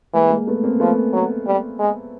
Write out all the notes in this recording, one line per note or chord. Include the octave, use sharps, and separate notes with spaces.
E3 G#3 A#3
G#3 A#3
A3 B3
A#3 C4
F3 A3 B3
F#3
G3
G#3